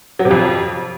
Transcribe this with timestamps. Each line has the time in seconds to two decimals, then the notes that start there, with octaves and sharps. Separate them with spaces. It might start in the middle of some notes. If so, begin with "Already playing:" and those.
0.19 F#3
0.25 C3
0.31 F2